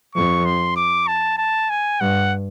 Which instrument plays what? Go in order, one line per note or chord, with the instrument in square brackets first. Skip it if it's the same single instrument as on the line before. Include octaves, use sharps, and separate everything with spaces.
[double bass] F2 [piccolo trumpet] C#6
[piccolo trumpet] C6
D6
A5
A5
G#5
[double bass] G2 [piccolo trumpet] F#5